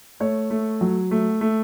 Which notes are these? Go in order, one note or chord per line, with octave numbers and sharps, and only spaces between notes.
A3 C#5
A3
F#3
A3
A3